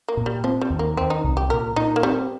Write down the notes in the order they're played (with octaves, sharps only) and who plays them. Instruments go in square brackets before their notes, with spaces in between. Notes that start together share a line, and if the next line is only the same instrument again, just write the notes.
[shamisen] A#3
[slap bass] A#2
[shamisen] G3
[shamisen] F3 [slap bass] C4
[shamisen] G3
[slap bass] D#2
[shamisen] A#3
[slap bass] D#3 [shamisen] C4
[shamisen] D#4
[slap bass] C2
[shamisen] G4
[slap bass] A#2 [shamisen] A#4
[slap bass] A#2 [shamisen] D#4
[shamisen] A#3
[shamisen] G3 [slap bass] C4